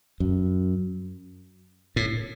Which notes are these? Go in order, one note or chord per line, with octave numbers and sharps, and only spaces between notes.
F#2
A2